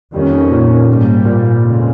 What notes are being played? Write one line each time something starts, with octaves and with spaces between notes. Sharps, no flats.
F2 D#3 G3 A#3 C#4
A#2
G#2 G3 A#3
A#2
F2 C#3 G#3 C4